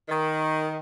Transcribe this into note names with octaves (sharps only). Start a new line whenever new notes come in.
D#3